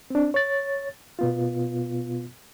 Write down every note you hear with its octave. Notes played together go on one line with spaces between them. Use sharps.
C4 D4
C#5 A6
B2 B3 F4